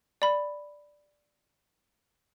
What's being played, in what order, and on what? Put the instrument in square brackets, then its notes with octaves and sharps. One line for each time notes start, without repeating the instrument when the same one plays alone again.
[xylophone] D5 B5